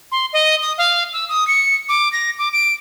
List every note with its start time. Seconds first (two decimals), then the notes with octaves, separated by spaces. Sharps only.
0.12 C6
0.33 D#5
0.62 D#6
0.78 F5
1.13 E6
1.29 D#6
1.48 C#7
1.89 D6
2.13 A#6
2.38 D6
2.53 D7